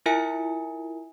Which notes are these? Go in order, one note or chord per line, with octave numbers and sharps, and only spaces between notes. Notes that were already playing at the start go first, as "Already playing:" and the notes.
E4 F4 A#4 E5 G#5 C#7